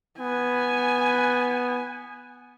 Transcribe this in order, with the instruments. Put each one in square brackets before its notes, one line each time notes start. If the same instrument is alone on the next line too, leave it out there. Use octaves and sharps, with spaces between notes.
[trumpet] B3 [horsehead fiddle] G#5